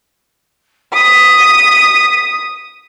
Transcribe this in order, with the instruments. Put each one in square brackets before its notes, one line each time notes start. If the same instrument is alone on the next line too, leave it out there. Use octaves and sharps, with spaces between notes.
[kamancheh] D#6 [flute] B6